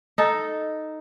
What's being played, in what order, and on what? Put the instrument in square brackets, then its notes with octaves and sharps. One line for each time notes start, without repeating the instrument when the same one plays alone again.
[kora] D#4 A4